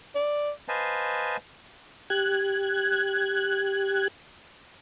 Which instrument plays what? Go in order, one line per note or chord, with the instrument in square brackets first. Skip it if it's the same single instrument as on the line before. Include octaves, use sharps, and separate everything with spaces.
[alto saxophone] D5
[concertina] B4 C5 D#5 F5 G#5 A5
[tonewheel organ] G4 F#6 G#6